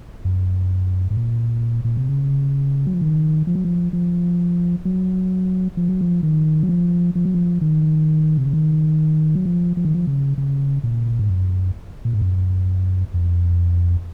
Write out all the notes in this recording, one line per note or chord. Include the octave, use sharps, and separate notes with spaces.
F#2
G#2
A#2
A#2
C3
C#3
F#3
F3
D#3
F3
F#3
F3
F3
F#3
F3
F#3
F3
D#3
F#3
F3
F3
F#3
F3
D#3
C3
C#3
D#3
F#3
F3
F3
D#3
F3
C#3
C#3
A#2
G#2
F#2
A#2
G#2
F#2
F2